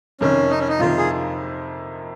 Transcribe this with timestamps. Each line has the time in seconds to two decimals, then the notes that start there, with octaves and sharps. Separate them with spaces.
0.21 F2 C3 D#3 C#4
0.50 D#4
0.59 C#4
0.68 D#4
0.79 F2 C3 D#3 F4
0.98 G#4